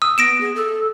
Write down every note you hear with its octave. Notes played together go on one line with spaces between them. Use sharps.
D#6 E6
B3 A#6 D7 E7
G#4
A4